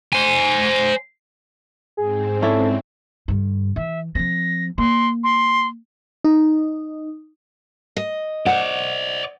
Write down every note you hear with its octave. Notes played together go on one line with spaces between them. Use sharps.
C5 G#5
G#2 C4 G#4
C#4 E4 A4 D5
G2 D3
E3 E5
F3 C4 A#6
A#3 C6
C6
D#4
D#5
C5 D5 F#5